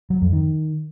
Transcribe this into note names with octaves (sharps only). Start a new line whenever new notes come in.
F#3
F2
D#3